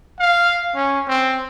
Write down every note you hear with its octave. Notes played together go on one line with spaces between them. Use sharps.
F5
C#4
C4